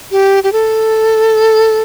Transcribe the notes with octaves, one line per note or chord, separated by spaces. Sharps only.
G4
G4
A4